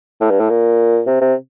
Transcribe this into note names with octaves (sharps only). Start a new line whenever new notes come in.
A2
G2
A2
A#2
C3
C3